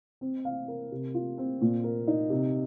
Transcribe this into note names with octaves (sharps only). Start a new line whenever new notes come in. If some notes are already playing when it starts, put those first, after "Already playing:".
C4
F5
A#4
C3
F4
C4
A#2
A#4
D#4
C3